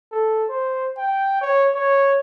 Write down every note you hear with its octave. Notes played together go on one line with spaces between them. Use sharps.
A4
C5
G5
C#5
C#5